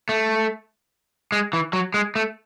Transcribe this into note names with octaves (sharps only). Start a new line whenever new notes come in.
A3
G#3
E3
F#3
G#3
A3